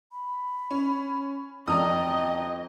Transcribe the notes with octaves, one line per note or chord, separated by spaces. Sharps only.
B5
C#4
F2 D5 D#5 G5 A#5 D#6